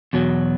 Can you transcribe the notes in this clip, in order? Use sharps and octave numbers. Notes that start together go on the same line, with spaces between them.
E2 B2 F#3